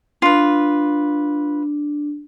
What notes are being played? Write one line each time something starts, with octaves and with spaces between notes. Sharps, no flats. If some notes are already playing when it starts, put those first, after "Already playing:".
D4 F4 B4